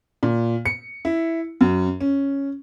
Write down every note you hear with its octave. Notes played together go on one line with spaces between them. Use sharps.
A#2
C#7
E4
F#2
C#4